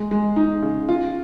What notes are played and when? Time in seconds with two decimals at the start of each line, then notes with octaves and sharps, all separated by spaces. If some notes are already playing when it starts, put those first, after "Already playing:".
Already playing: G#3
0.11 G#3
0.36 D#4
0.62 C#3
0.89 F4